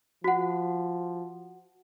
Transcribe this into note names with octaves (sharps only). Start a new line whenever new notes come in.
F3 F#4 F#5